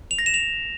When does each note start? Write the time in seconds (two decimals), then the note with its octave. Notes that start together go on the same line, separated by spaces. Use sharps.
0.11 F7
0.19 A#6
0.26 E7
0.34 F7